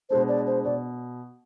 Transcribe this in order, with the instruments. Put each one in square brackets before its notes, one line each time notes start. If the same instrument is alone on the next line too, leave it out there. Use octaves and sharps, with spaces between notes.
[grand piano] B2 G#3 D4 [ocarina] C5
[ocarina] D5
C5
[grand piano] B2 [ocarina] D5